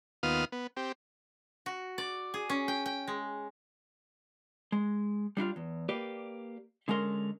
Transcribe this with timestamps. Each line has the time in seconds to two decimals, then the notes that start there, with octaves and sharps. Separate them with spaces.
0.23 D#2 B3 F4 D#6 F6
0.52 B3
0.77 C4 G4
1.66 F#4
1.98 D5
2.34 G#4
2.50 C#4
2.68 G5
2.86 G5
3.08 G#3
4.72 G#3
5.37 G3 D4 D#4 F4
5.56 E2
5.89 A#3 G4 B4 D5
6.88 D3 G#3 C#4 A#4 C6